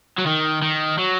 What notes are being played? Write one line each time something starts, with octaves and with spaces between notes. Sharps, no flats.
F#3
D#3
D#3
F#3